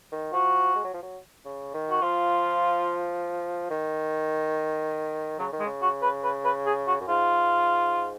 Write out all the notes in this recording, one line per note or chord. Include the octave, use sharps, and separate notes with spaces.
D#3
F3 F#4
G#3
F#3
F3
F#3
C#3
D#3
F#4
F3 F4
D#3
C#3 F#3
D#3
G#3
C#3
F#4
B4
B4
B4
G#4
F#4
F#2
G#2 F4